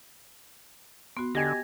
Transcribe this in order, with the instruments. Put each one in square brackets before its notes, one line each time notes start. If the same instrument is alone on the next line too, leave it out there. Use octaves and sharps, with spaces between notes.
[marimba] B3 F#4 [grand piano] C6
[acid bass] D3 [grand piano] G4 D#5 G#5 [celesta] G#6 A#6